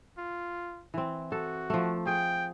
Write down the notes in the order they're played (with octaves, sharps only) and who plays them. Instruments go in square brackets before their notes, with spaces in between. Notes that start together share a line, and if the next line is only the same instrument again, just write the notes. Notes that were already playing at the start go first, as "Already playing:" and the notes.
[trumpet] F4
[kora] E3 C4
[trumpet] F#4 [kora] A4
[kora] F3 A3
[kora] G#4 [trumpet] G5